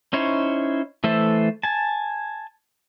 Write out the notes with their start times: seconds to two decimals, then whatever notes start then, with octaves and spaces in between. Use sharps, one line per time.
0.13 C#4 D#4 E4 C5 C#5
1.04 E3 A3 A4 C5 E5
1.63 G#5 A5